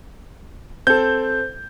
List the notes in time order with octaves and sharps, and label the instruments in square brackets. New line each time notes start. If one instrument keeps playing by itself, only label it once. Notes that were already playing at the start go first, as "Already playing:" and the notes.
[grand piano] C4 A4 [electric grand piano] G6